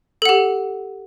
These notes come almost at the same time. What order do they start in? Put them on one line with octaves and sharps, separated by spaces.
A4 F#5 G4